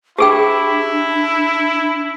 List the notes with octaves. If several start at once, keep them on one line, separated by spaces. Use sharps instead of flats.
D4 E4 G4 G#4 G5